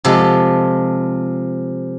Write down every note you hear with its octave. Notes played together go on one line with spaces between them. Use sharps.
C3 F3 G#3 A4